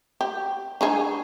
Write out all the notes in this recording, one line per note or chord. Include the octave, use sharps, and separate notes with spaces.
G4
D4 D#4 G#4